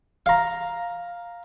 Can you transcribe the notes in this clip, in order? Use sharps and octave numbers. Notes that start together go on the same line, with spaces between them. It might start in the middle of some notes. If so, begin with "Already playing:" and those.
F5 A#5